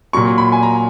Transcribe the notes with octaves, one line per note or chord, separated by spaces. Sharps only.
A#2 F#3 C#6
B5
G#5
A#5